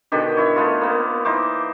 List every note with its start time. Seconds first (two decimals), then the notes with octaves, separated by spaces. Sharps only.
0.12 B2 D3 D#3 G4
0.37 E4 C#5
0.56 A3 B3 F4
0.81 A#3 B3
1.25 E3 D#4 C5 D6